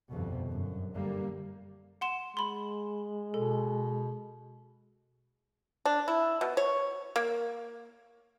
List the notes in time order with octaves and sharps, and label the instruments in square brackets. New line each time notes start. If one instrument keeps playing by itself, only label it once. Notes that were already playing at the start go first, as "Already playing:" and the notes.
[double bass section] G1 C2 F2 B2
G1 F#2
D3 G3 A#3
[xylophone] F#5 C6 E7
[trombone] G#3 [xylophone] B5 C6
[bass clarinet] B2 [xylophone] A4
[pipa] D4
E4
B2
C#5
A#3